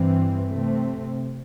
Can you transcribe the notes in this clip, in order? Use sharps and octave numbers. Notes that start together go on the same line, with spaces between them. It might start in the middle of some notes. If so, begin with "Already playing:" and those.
Already playing: G2 E3 C4
C3 A3 C4